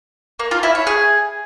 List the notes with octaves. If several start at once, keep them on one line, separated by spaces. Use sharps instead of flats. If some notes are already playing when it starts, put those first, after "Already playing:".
A#3
F4
E4
C#5
G#4